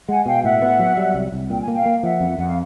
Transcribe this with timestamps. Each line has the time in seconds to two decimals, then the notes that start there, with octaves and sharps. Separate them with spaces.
0.08 G#3 F#5 G#5
0.26 B2 F5 G5
0.43 A2 E5 F#5
0.62 B3
0.79 F#3
0.97 G3
1.14 C2
1.32 C2
1.50 A#2 G5
1.62 G#5
1.68 A#3
1.74 F5 G5
1.86 A#3
2.03 F3 E5 F#5
2.20 F2
2.38 F2 F#5
2.48 F5